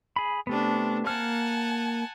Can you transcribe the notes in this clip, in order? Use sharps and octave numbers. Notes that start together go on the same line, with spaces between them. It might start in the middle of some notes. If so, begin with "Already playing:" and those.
G#4 B5
C3 A3 B3 D4
A#3 F#5 G#5 A5 F6